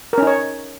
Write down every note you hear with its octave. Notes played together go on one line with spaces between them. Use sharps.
C#4 D#4 A#4 C#5